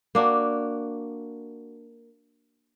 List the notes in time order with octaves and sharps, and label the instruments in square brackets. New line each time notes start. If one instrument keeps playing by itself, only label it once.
[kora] A#3 D4 F#4